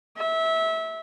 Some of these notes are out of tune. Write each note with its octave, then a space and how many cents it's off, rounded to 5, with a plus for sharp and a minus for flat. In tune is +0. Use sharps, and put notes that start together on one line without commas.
E5 -20